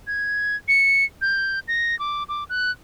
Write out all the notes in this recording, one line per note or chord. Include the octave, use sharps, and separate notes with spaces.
G#6
C#7
G6
A#6
D6
D6
F#6